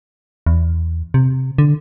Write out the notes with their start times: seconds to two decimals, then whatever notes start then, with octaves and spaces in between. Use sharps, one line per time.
0.46 E2
1.14 C3
1.58 D3